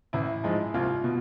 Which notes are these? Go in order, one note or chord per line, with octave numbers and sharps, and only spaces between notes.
A1 E4
G#2 F3 G#3
C2 F4
B2